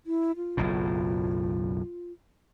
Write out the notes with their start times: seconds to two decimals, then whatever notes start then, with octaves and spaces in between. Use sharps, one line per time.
0.06 E4
0.36 F4
0.57 F#1 B1 A2